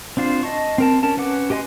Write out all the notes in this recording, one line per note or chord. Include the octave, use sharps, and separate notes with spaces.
C4 D4 F4 C5
D#5 A5 C#6
C4 A#4 A5
C#4 A#4 A5
C#4 B4 F#5 D6
G4 B4 D#5 G#5 C6